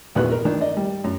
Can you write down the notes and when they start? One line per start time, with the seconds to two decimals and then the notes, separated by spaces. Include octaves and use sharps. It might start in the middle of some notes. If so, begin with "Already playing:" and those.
0.15 A#1 E2 D#3 B3 F#4 F#6
0.32 A#4
0.45 D#3 D4
0.61 D5 D#5
0.77 G3
1.04 F#2